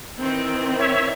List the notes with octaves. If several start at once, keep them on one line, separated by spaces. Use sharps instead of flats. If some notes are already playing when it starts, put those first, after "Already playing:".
D#3 E3 C4
C#5 E5